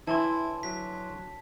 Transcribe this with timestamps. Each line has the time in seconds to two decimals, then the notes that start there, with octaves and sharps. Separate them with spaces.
0.07 D3 E3 E4 C#5 A5 C6
0.63 F#3 B6